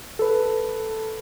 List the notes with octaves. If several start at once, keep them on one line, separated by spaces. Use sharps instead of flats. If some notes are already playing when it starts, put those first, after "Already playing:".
A4 B4